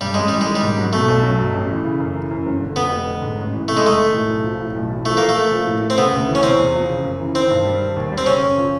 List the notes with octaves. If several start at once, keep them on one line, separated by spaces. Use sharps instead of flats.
G2 G3
A1 G#3
E3 G3
G#3
D#3
G3
G#2
F#3
B2 A3
B1
F#3
G2
A1
E3
C#3
F#2
E3
F#2
G1
D3
F2 B3
F1
D3
G#2
A1
E3
C3 A3
G#3
E2 A3
D#3
A2
B1
F3
A2
B1
E3
F3 A3
A#2 A#3
A3
A#3
F3
A2
A3
C4
C#3 B3
D2
E3
C#4
C3 C4
E2
F3
C#3
F#2
E3
D#3 C4
G2
G3
D#3
D#2
G3
C4
C#3 C#4
F#2
F3